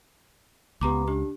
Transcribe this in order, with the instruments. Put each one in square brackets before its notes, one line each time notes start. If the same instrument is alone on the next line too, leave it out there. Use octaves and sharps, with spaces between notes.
[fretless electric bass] C#2 [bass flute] B3 [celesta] G4 A#5 D6
[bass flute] D4 [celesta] G4